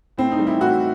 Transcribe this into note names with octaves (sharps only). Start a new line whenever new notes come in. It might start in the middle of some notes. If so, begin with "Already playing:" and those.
A2 C4
D#4
G3
E3 E4
A2 F#4